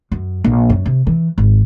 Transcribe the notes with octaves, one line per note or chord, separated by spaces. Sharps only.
F#2
A#1
F#2
C3
E3
G#1